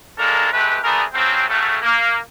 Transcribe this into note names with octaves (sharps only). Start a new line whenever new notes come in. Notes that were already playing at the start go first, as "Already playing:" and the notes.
F#3 G#3 A#3 D4 A4 A#4
C3 G#3 A3 G4 B4
A3 B3 D4 G#4 A#4
F3 F#3 G#3 C4
A2 C#3 F#3 A3
A#3